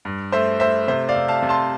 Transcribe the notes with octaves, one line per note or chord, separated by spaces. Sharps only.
G2
A3 C5 E5
A3 C5 E5
C3 C5 E5
D5 F5
C3
F5 A5
C3
A5 C6